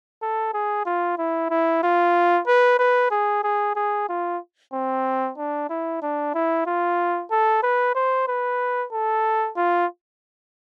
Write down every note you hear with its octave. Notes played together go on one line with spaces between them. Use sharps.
A4
G#4
F4
E4
E4
F4
B4
B4
G#4
G#4
G#4
F4
C4
D4
E4
D4
E4
F4
A4
B4
C5
B4
A4
F4